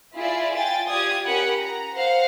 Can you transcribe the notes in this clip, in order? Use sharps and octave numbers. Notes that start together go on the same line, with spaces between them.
E4 F4 G#4 D5 E5
F4 G5 G#5 A6
F4 G4 D5 D#6 G#6
C#4 G4 A#4 F#5 B5
A#5
C5 F5 F#5